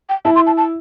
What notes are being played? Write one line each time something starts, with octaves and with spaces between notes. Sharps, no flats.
G5
E4 A5
C6
A5
A5